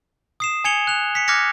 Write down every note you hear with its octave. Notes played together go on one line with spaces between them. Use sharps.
D#6 C7 E7
G#5 G#6 C#7 F7 G7
F#6 F7
B6 C#7
D6 F6 F#6 G#6 A#6 C#7